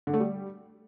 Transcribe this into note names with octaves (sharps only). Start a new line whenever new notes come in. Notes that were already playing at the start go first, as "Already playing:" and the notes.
D3
A3
G3